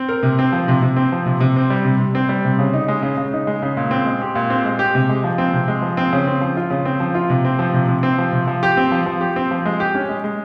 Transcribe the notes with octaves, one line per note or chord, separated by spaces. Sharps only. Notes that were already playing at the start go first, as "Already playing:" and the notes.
Already playing: C4
A#4
C3
C4
F3
C3
C3
C4
F3
C3
C3
C4
G3
C3
C3
C4
G3
C3
C#3
D#4
G#3
C#3
C#3
D#4
G#3
C#3
A#2
C4
G#3
G4
A#2
C4
G#3
G4
C3
G#3
F3
C4
C3
G#3
F3
C4
C#3
C4
F3
F4
C#3
C4
F3
F4
C3
C4
F3
C3
C3
C4
F3
C3
F3
G4
C4
F3
F3
G4
C4
F3
G#3
G4
C#4
G#3
G#3